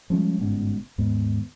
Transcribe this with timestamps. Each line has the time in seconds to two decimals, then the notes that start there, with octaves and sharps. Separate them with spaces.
0.10 F3 G3 G#3 C#4
0.39 G1 G#2 B2 C#4
0.98 D#2 G#2 B3